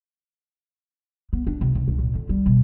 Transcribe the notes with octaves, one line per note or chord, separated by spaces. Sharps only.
B3
D4
C3
C#2
C#2
A#2
D3
G3
B2